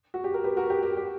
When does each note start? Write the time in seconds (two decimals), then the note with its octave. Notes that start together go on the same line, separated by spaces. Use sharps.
0.14 F#4
0.24 G4
0.34 A#4
0.44 G4 B4
0.57 F#4 A#4
0.70 G4
0.83 G4
0.97 G4